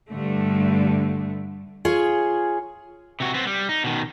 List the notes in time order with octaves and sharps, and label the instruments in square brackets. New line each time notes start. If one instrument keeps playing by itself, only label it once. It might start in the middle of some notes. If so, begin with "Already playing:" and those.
[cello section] G2 D3 A3
[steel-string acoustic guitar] F4 G#4 C#5
[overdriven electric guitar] C3 F#4
B3 C4
G3
D#4
B2 D#3